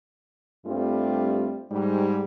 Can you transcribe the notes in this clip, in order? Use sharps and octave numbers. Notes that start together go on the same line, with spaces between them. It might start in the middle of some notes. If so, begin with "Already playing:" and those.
G2 G3 A3 C4 F4
G#2 G3